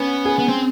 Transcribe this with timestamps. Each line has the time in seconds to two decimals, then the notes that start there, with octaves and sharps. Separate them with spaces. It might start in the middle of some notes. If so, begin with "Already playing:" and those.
Already playing: B3 C#4
0.25 G#4
0.39 B3
0.49 C4